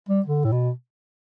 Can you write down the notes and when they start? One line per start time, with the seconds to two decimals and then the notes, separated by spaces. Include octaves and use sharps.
0.09 G3
0.26 D3
0.45 A2
0.52 B2